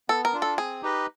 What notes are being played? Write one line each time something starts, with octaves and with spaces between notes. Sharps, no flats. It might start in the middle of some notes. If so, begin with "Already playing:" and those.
B3 A4
A#4
D4 F4
A4
C4 G#4
D#4 G4 B4 D#5